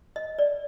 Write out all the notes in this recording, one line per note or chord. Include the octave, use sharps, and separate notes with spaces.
D#5
D5